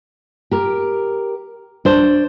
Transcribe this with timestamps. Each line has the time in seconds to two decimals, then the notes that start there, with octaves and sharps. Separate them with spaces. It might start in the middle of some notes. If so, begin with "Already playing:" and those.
0.51 G4 A#4
1.85 D4 C5